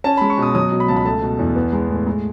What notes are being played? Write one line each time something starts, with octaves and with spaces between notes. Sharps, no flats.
C#4 A5
G#3 B5
C#6
B2 D#6
F#3 D#6
B2
B5
C#2 A5
B5
A3 A5
B2
E2
B3
G#3
A2
G#3